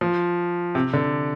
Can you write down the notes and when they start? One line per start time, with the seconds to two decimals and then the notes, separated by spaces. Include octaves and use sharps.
0.01 F3
0.75 C3
0.93 D3